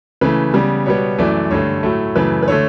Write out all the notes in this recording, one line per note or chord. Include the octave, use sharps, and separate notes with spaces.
C#3 E3 A3 B4
C#3 G3 B3
B2 G3 B3 C#5
F#2 E3 A3 D5
G2 D3 A3 C#5
A2 F#3 A3
F#2 C#3 E3 A3 B4
B4
D3 A3 C#5